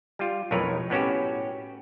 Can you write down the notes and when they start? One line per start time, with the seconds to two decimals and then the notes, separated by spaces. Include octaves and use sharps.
0.19 G3 F4
0.51 B1 F2 A2 A#4 B4 C#5
0.90 A2 B3 C#4 F#4 G4